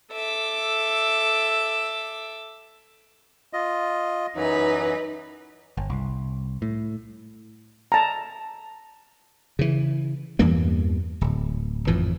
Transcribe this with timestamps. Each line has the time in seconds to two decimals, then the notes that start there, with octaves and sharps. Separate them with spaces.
0.12 A4 E5 D6
3.53 F4 D#5
4.36 F#2 E3 F#3 D#4 B4
5.77 G1
5.90 C2
6.62 A2
7.92 A5 A#5
9.59 C#3 E3
10.39 E2 G2 E3 A#3
11.21 D1
11.87 G#1 F2 A2 E3